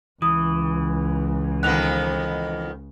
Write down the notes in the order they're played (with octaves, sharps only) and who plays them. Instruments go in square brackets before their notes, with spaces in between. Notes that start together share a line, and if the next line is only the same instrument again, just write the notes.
[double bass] C#2 [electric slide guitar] E3 [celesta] D#6
[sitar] F2 D#3 B3 [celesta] F#6 F7